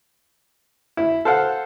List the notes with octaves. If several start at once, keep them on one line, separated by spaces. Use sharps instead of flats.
E4
A4 C5 F5 F#5